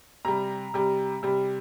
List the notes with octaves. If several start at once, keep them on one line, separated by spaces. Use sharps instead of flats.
C3 G3 A#5
C3 G3
C3 G3